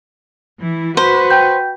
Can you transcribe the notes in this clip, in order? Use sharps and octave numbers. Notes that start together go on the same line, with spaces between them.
E3 E4
F#4 B4 C5
G5 G6